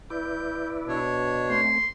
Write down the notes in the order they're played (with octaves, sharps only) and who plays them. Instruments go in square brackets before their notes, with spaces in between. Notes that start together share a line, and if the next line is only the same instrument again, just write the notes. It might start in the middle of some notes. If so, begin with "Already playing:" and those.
[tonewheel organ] E4 B4 D5 [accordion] G6
[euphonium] B2 [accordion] D4 C#5
[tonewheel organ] A3 C4 [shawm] C6